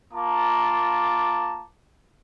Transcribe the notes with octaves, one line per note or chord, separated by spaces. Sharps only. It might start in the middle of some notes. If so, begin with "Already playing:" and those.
A#3 F4 A5 A#5 D6